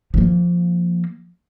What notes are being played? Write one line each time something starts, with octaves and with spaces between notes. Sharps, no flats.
F3 A#3